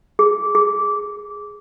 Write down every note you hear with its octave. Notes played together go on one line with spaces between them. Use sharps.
G#4
G#4